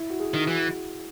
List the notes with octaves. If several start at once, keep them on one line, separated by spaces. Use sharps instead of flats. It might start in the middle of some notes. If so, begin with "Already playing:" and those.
Already playing: E4
F#4
G#4
D#3
E3 F#4